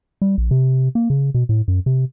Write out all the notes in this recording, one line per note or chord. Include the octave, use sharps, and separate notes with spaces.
G3
A#1
C3
A#3
C#3
B2
A2
F#2
C3